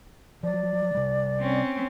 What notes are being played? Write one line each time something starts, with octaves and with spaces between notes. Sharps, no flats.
F3 F#3 D5
C3 G3
C4 C#4